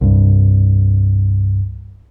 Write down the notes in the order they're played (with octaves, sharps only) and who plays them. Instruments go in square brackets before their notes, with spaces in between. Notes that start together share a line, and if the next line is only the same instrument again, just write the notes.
[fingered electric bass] C2 G2